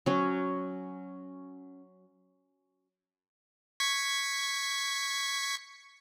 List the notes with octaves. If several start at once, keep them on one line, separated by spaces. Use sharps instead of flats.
F#3 C#4
C#6 G#6 B6